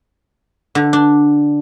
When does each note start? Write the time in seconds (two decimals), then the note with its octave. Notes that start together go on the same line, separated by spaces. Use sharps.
0.75 D3
0.93 D4